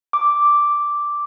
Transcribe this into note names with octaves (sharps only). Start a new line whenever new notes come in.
D6